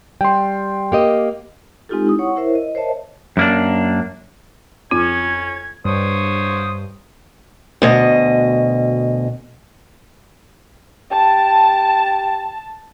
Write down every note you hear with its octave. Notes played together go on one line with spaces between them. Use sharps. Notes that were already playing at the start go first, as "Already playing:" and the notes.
G3 G5 C6
A#3 G4 D#5
G#3 C4 D#4 F4 G4 A4
E4 D#6
C#5 F#5 C#6
E4 A#4 C5 C#5 E5
D#5
A#4 C5 C#5 D#5 E5 A5
F#2 A#3 D4
F2 C#4 F4 G#6
G2 C5 C#5 D#6
D2 B2 D#5
G4 A5